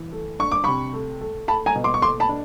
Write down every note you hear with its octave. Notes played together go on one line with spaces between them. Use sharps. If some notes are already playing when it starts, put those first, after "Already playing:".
Already playing: E3
A3
D4 C#6
D6
C3 B5 C#6
A3
A3
A3 A5 B5
G#5 A#5
B2
C6 D6
C#6
A3 C6 D6
A5 B5
D4